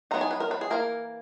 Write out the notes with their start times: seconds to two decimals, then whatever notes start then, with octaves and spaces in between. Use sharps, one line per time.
0.11 F#3 B3 D#4 A#5
0.21 G#5
0.31 B4
0.40 A#4
0.51 B4
0.61 G#4
0.70 E3 A#3 A#4